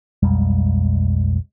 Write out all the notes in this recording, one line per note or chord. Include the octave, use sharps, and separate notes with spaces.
B1 F2 G3 G#3